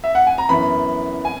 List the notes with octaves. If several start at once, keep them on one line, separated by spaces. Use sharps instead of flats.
E5
F#5
G#5
A#5
F#2 E3 B3 B5
G#5